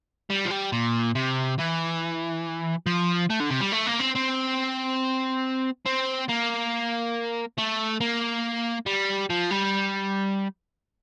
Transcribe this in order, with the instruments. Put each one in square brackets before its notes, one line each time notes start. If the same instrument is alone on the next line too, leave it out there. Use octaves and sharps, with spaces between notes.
[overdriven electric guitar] G3
F3
G3
A#2
C3
E3
F3
A3
D3
C3
G3
A3
A#3
C4
C4
C4
A#3
A3
A#3
G3
F3
G3